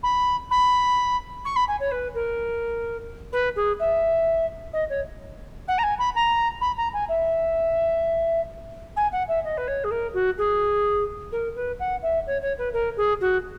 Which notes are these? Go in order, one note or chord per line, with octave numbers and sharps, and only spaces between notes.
B5
B5
C#6
B5
G#5
C#5
B4
A#4
B4
G#4
E5
D#5
C#5
F#5
A#5
G#5
B5
A#5
B5
A#5
G#5
E5
G#5
F#5
E5
D#5
B4
C#5
G#4
A#4
F#4
G#4
A#4
B4
F#5
E5
C#5
C#5
B4
A#4
G#4
F#4